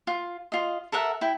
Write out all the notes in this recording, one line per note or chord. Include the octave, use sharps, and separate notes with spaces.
F4
F4 D#5
A4 A#4 E5 F#5
E4 G5